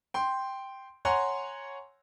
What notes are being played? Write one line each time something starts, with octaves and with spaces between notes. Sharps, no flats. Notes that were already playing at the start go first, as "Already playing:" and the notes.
G5 C6
C#5 F#5 G#5 A#5 C6